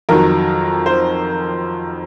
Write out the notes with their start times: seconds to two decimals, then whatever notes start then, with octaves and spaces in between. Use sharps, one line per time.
0.09 F2 D#3 F#3 A#4
0.86 C5